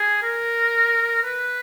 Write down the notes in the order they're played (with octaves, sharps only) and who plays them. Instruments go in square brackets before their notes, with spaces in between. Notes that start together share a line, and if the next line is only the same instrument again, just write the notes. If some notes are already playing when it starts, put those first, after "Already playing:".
Already playing: [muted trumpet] G#4
A#4
B4